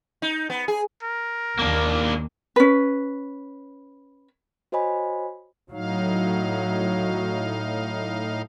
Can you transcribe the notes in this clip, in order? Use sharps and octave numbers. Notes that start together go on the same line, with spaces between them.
D#4
B3
G#4
A#4
D#2 A#3 D4
C#4 B4
F#4 C5 C#5 D#5 G#5 B5
A2 F#3 D#4 F5